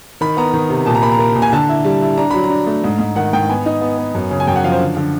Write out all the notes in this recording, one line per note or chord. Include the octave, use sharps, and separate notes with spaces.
D#3 B5
B3 A#5
D#3
C3
A#2 A5
A#5
A#3 B5
A#5
A#3
A#2
G#5
D3 A5
E4
G3
E4
D4 A#5
F#3 B5
A#5
D4
A3
G#2
G#2
D#3 F#5
G#2 G5
B3 G#5
D#4
B3
B3
F#2
C#3
G#5
F#2 G5
F#5
F3 F5
C5
D3
D3